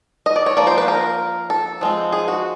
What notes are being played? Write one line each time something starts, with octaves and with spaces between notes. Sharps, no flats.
D#5
D5
C#5
F3 A#3 D5
C5
B4
A#4
A4
F3 G#3 C4
G#4
F#4